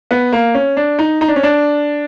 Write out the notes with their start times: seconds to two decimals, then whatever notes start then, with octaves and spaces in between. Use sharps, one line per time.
0.11 B3
0.32 A#3
0.54 C#4
0.77 D4
0.99 D#4
1.21 D#4
1.28 D4
1.36 C#4
1.43 D4